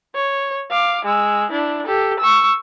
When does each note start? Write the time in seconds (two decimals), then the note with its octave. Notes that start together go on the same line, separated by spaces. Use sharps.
0.15 C#5
0.70 F5 D6
1.05 G#3 E6
1.50 D4 E4
1.86 G4 A4
2.19 C#6 E6